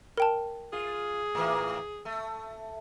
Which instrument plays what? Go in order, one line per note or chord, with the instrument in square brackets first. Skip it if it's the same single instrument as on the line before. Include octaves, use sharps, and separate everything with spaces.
[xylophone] A#4 G5 A5
[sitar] F4 [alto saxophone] G#4
[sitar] A2 E3 A#3
A3